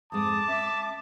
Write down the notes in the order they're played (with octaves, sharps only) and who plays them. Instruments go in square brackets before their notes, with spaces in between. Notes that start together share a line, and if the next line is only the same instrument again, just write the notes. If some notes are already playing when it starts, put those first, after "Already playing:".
[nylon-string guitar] F2 G#2 G#3 [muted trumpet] A5 [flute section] D6 [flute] D#6
[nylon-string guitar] C#4 [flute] E5